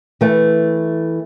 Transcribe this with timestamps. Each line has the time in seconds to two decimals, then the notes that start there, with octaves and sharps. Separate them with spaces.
0.21 E3 A3